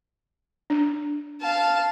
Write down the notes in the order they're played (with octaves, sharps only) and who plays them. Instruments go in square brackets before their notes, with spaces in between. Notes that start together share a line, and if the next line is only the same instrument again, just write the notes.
[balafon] D4
[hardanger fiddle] F5 A5